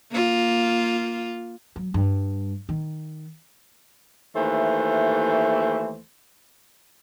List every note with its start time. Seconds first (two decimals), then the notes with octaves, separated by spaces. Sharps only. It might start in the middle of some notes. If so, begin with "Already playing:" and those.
0.11 A#3 F4
1.76 F#3
1.94 G2
2.69 D#3
4.36 D#2 E3 A3 C5